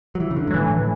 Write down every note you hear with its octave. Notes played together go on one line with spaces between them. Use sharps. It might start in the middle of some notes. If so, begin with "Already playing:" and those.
F#3
E3
C#3
D3
G#2
F#3
A2 E3